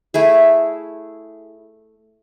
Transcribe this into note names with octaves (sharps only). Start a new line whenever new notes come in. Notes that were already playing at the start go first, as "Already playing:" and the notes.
A3 E4 G#4